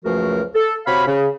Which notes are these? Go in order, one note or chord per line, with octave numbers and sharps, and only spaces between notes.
C#2 F#2 F3 A3 F#4 A#4
A4
C3 F#4 C#5 F5 B5
C#3